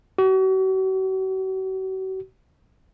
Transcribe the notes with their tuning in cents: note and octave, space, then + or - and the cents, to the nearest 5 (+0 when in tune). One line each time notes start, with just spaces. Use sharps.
F#4 +40